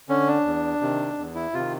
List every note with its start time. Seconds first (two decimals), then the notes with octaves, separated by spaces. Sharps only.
0.09 D3 C#4
0.27 D4
0.45 E2
0.81 C3 D#3
1.18 E2
1.35 E4
1.54 C3 D#3 F4